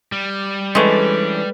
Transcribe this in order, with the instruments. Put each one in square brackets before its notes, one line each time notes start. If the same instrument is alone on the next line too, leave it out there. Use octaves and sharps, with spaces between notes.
[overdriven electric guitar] G3
[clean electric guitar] E3 C#4 D4 [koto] G#3 A3 [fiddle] B4